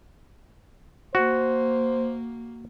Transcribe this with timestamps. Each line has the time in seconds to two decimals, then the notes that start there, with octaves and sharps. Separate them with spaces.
1.15 A#3 F#4 C5